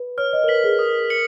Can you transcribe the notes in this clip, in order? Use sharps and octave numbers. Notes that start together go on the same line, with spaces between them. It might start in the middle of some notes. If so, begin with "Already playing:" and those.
Already playing: B4
C#5 F6
D#5
A#4
B4 B6 F#7
G#4
A#4 D#6
C#7 F#7